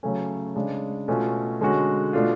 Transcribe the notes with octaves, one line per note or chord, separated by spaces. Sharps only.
C#3 F#3 A3 C#4
C#3 G#3 D4
B2 A3 C#4 F4
D3 G#3 C#4 F#4
B2 A3 D4 F4